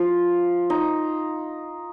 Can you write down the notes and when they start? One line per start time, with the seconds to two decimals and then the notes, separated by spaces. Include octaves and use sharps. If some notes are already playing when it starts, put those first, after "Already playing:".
Already playing: F3 F4
0.70 D#4